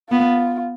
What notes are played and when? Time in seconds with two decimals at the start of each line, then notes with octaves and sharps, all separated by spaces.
0.11 B3 F4